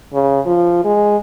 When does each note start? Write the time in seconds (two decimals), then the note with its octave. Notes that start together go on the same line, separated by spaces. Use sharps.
0.14 C#3
0.46 F3
0.85 G#3